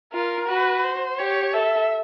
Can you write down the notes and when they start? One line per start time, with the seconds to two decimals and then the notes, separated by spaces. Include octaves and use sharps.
0.13 F4 A#4
0.48 F#4 B4
0.84 C5
1.18 G4 C#5
1.53 A4 E5